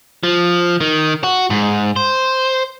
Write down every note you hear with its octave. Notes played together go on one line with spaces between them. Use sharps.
F3
D#3
F#4
G#2
C5